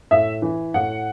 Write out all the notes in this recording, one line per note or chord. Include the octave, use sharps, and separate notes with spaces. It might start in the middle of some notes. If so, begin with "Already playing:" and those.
A2 E5
E3
A2 F#5